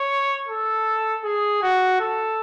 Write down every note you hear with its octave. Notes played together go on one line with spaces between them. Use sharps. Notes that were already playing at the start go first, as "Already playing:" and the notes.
Already playing: C#5
A4
G#4
F#4
A4